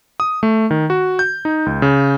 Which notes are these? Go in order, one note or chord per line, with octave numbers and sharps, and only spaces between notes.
D#6
A3
D#3
F#4
G6
D#4
C#2
C#3